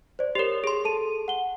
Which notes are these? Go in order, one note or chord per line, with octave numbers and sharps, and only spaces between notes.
C5 D5
G4 A#4 C#5 F7
G#4 C6
A4 A5 D#7
F#5 G7